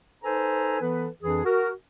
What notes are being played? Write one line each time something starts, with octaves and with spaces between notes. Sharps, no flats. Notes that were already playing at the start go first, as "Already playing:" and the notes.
D#4 A4 B4 C5 G#5 A#5
E3 B3 A4 B4
F2 E3 D4 G#4
F#4 A#4